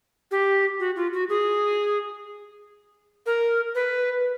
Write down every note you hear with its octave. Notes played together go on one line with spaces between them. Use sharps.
G4
F#4
F4
F#4
G#4
A#4
B4